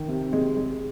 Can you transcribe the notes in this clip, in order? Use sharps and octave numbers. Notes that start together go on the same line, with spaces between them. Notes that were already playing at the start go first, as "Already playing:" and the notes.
Already playing: D#3
C3
G#3
G#3